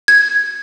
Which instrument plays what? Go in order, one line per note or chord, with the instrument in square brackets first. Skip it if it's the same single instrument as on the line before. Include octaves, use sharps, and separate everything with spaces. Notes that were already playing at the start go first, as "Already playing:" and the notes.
[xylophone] G#6